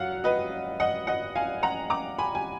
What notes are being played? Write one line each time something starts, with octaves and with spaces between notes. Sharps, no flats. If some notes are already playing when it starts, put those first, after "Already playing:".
Already playing: F#2 F5 F#5
B4 D#5
D#5 F#5
D#5 F#5
F5 G#5
F#5 A#5
A#5 D6
G#5 B5
G#5